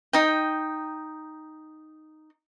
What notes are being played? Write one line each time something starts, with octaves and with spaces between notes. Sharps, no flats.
D#4 G5